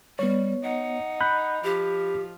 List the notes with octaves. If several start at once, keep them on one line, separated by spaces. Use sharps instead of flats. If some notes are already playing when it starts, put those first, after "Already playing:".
G3 B3 C#5
D#4 F#5
B5 F#6 G6
F3 G4